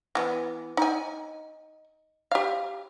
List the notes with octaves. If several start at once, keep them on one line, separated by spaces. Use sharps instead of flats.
E3 B3
D#4 G#5
G4 F5